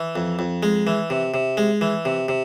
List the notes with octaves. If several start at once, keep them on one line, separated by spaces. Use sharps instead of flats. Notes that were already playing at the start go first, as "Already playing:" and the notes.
Already playing: E3
F2
F2
G#3
E3
C3
C3
G#3
E3
C3
C3